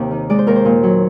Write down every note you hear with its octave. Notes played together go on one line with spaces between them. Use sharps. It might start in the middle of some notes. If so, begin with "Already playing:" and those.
Already playing: D#2 C3 D#5
D#3
G#3 D5
C5
D#2 A#4
C5
A#2
F#3